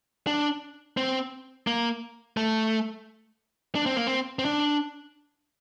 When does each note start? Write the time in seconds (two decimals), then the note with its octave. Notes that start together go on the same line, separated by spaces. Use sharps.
0.27 D4
0.97 C4
1.67 A#3
2.37 A3
3.75 D4
3.86 C4
3.96 A#3
4.07 C4
4.39 C4
4.45 D4